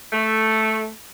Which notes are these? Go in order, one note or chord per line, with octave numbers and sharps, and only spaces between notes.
A3